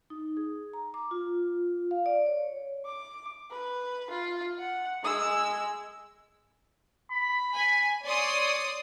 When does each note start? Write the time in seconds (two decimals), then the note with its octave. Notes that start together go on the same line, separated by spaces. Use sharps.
0.10 D#4
0.37 G#4
0.73 A#5
0.94 D6
1.11 F4
1.91 F5
2.06 D5
2.26 C#5
2.85 D6
3.51 B4
4.10 F4
4.59 F#5
5.03 G#3 E6
7.12 B5
7.55 G#5
8.03 C#5 D5 C6 D#6